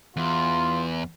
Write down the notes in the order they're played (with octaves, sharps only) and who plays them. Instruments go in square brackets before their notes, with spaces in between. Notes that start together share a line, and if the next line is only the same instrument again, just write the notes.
[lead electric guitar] E2 [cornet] F4